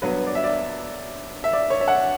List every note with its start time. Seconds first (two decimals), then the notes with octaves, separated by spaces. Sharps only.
0.02 G2 F#3 B3 B4
0.27 D5
0.35 E5
0.44 D5
1.44 E5
1.53 D5
1.70 C#5
1.81 E5
1.88 F#5